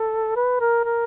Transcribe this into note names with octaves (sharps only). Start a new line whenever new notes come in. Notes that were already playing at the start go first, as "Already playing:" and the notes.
Already playing: A4
B4
A#4
A#4